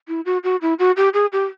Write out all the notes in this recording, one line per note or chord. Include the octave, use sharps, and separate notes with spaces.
E4
F#4
F#4
E4
F#4
G4
G#4
G4